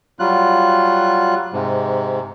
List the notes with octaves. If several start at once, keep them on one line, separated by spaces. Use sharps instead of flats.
F#3 G3 F4 F#6
G#2 C3